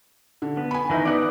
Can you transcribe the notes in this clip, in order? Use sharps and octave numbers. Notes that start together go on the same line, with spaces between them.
D3
B3
G#5 B5
D#3 E3 D#4
B3 D#4 B4 D5 F#5 D#6